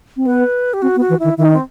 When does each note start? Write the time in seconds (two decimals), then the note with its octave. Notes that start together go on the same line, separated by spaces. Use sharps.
0.17 C4
0.26 B3 B4
0.74 G4
0.82 C4 F#4
0.96 B3
1.00 F#4
1.09 E3
1.20 D#3 E4
1.38 D#3 E4
1.46 D#4
1.54 C4